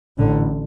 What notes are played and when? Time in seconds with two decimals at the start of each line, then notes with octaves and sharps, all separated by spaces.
0.18 A1 A2 D3